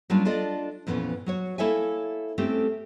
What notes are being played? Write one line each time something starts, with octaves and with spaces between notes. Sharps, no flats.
F#3 G3 A#3 C#4 D4 F4
D4 F4 A4 D5 D#5
F2 A#2 E3 A#3 B3 C#4
F#3 F#4 C#5
A#3 E4 A4 C#5 E5 G#5
A3 C4 C#4 G4 A4